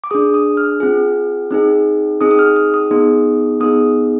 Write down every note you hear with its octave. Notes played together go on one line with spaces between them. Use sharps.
D6
D4 G#4 D#6
D#6
F6
C4 F4 G#4
C4 D#4 G#4
C4 D#4 G#4 D#6
D#6
F6
D#6
D#6
B3 D#4 G#4
B3 D#4 G#4 D#6